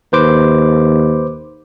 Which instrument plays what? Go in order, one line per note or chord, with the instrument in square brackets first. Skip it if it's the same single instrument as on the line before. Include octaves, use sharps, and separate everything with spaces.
[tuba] D#2 [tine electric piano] B4 C5 D6